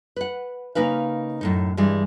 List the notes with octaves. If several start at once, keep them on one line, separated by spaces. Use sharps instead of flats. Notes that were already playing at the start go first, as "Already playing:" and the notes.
B4 F#5
C#3 A#3 D#4 B4 F5
F#2 A2 D#4
G2 E3 G3 G#3